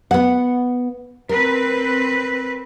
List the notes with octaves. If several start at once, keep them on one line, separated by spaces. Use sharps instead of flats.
B3 F#5
C4 A#4 B4